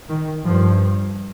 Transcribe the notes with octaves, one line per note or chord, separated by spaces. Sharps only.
D#3
G2 F3